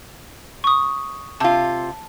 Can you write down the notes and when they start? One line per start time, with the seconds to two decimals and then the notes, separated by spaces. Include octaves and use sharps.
0.64 C#6 D#6
1.40 C3 F4 A5